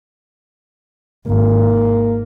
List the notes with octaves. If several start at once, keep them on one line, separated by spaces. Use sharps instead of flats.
G#1 A#3